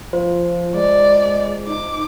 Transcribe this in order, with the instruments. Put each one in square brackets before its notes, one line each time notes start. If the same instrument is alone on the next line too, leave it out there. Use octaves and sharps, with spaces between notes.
[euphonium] F3 [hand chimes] F4 C5
[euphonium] G#3 [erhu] D5
[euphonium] D#4 [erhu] D6